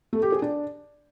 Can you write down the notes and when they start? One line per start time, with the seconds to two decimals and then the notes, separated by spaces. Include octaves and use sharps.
0.13 A3
0.23 G4
0.32 G#4
0.42 D4